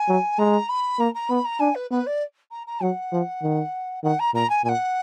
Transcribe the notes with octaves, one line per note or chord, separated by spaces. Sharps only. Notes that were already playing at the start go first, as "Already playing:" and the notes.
Already playing: G#5
F#3
G#3 A#5
B5
A#3 A#5
A#5
B3 B5
A#5
D4 G#5
B4
B3 B4
D5
A#5
A#5
F#3 F#5
F3
D#3
D#3 F#5
A#5
A#2 A#5
G#5
A#2 G#5
F#5